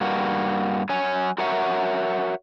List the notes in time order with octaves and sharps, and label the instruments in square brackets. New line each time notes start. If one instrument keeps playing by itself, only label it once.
[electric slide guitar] G2 A#3 F#4
F#3 C#5 G#5
F#4 A#4 C#5 E5 F#5